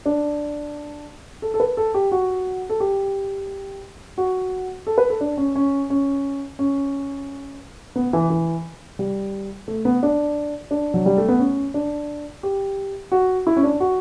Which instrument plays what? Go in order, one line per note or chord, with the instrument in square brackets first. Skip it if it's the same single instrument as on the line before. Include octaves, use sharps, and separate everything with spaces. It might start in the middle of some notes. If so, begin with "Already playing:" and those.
[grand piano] D4
A4
A4
B4
A4
G4
F#4
A4
G4
F#4
A4
B4
A4
D4
C#4
C#4
C#4
C#4
B3
E3
E3
G3
A3
B3
D4
D4
F#3
G3
A3
B3
C#4
D4
G4
F#4
E4
C#4
D4
F#4